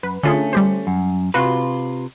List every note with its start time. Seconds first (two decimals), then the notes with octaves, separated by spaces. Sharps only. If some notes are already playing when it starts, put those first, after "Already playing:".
0.03 F#2 B4
0.23 D3 A3 C#4 F4 G#4
0.53 G3 G4 C5
0.87 F#2
1.34 C3 F4 F#4 B4